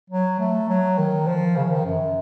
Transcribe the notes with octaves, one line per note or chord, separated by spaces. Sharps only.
F#3
A3
F#3
D#3
F3
C#3
F3
D#3
F#2